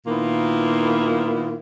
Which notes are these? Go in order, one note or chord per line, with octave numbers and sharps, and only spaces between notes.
A#2 D#3 A#3 B3 E4 F4